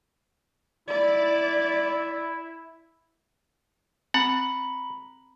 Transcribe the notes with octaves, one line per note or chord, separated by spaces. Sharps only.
E4 D5
C4 F#5 A#5 B5